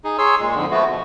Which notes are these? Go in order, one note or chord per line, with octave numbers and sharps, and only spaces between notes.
D#4 G#4
G#4 C#5 C6 E6
A#2 G#3
F2 G#2 D3
F3 A3 B3 F#4
B2